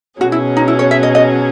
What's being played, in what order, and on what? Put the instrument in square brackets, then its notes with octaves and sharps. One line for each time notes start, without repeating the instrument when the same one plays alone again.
[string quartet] B2 F#3 C#4 G#4 [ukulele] F#4
[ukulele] E4
D#4
E4
C#5
E5
D#5
D#5